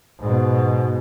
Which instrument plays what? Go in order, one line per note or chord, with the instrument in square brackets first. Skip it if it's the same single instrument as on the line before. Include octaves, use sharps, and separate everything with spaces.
[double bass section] G#2 B2